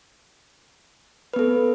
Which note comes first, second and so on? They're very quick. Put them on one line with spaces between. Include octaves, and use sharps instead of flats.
B4 B3 A4